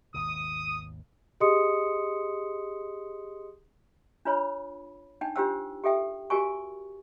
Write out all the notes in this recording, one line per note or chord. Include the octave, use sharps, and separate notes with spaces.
G#1 D#2 B2 D#6
G4 G#4 D#5 C6 D#6 C#7
D4 F4 B4 C#5 B5
D4 D#4 G5
D4 F4 G4 C5 G5 E6
G4 A4 E5 G5
F#4 G4 A#4 G#5 C#6